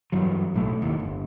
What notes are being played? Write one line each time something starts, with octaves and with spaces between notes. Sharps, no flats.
G2 E3 F#3
B1 A2 A3
D#2 A2
G1